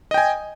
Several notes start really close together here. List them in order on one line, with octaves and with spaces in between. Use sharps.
D#5 G5 G#5